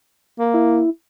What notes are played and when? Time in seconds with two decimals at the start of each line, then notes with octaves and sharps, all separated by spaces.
0.39 A#3
0.54 E4